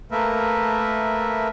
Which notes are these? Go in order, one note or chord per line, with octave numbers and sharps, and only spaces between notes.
A3 A#3 A#4 B4 E5